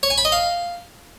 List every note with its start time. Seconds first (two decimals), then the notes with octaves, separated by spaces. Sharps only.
0.03 C#5
0.10 G#5
0.18 B5
0.25 D#5
0.32 F5